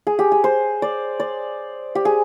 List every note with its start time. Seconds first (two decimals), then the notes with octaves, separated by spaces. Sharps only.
0.07 G#4
0.19 G4
0.32 G#4
0.44 C5
0.82 D5
1.20 D5
1.95 G4
2.05 G#4